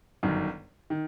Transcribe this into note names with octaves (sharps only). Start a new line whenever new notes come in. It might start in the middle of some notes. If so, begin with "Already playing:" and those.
G1 F#2 D#3
D#3